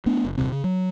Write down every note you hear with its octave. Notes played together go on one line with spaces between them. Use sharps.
A3 B3 D4
F#1
D#1 C2 C3 C4
C#3
F#3